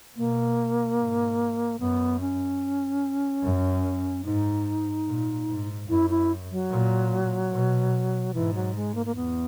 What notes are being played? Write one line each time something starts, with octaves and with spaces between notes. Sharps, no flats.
B2 A#3
G#2
F#2 B3
C#4
F#2
G#2 D#4
A#2
G#2
F#2 E4
E4
F#3
A#2
B2
G#2 E3
F#3
G#3
A#3
A#3
E2 B3